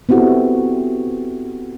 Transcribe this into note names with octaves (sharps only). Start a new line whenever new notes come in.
B3 C4 E4 F#4 G4 A4